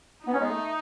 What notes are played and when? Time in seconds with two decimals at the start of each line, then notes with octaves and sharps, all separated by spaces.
0.26 B3 D#4
0.34 C#4
0.40 G#3 B3
0.50 A3